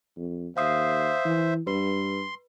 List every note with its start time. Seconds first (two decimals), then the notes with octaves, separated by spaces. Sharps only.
0.17 F2
0.57 D#2 C5 E5 F5 D#6 C7
1.25 E3
1.67 G2 B4 C6